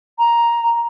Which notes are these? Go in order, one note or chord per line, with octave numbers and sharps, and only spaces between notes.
A#5